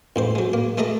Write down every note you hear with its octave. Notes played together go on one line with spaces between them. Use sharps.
A1 G#2 C5
F#3 G#3
A#3
G#3 A3 A4 D#5 A#5